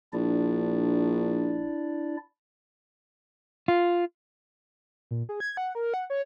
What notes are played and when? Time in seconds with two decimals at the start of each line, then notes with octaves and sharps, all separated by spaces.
0.13 A#1 D4 E4 D5
3.68 F4
5.11 A#2
5.29 G#4
5.40 G#6
5.57 F#5
5.75 A#4
5.94 F#5
6.10 C#5